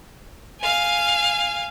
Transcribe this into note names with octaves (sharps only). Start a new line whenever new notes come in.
F5 G#5